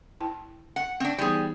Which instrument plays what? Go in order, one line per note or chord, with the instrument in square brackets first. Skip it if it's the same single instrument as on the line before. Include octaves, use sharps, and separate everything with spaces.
[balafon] E4 G5 A5
[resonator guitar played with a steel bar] F#5
C4 D4
[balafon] E3 B3 D#4 [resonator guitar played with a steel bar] G3 G#4